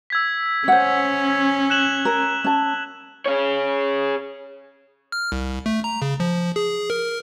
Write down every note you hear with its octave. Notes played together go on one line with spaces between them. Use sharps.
E6 G#6 B6
C#4 C5 F#5
F#6 E7 F#7
A#4
C#4 A5
G#4 C#5
F6
C2
A3
A#5
C#3
F3
G#4
A#4